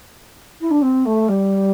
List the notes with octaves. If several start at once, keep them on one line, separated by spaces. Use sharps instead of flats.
E4
D4
C4
A3
G3